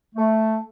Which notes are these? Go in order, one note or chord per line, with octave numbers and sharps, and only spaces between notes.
A3